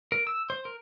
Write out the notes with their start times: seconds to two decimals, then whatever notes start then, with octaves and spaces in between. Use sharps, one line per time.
0.12 A#4
0.27 E6
0.50 C5
0.65 A#4